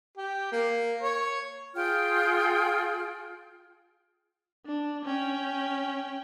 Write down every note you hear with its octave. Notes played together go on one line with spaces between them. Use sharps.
G4
A#3
C#5
F4 G#4 G5 F6
D4
C#4 G5